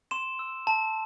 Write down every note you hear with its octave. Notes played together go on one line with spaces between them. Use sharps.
C6 E7
E6
A5